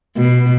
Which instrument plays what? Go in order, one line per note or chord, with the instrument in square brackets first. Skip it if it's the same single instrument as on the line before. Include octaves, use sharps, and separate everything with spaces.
[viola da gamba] B2